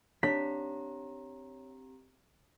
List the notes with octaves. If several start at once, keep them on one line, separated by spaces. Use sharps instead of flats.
C4 D4 G4 C#5 A#5 B6